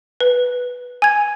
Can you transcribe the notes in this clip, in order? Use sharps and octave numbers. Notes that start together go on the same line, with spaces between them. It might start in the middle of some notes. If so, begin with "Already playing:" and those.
B4
G#5 G#6